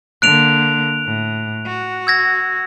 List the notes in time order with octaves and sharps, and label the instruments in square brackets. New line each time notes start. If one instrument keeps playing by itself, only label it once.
[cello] D3 A#3 [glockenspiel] F#6 D7 F7
[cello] A2
F#4
[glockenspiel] E6 G#6 A#6